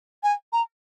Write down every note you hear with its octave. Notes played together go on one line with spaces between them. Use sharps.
G#5
A#5